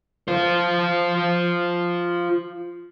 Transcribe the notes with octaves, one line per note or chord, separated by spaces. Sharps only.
F4 C5